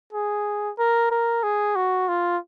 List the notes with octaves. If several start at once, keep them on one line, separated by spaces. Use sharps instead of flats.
G#4
A#4
A#4
G#4
F#4
F4